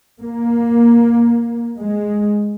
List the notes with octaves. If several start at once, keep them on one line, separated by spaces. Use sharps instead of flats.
A#3
G#3